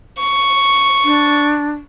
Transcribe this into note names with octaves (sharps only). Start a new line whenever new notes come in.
C#6
D4